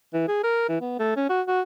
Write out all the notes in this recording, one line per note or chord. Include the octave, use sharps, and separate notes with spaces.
E3
G#4
A#4
E3
B3
A3
C#4
F#4
F#4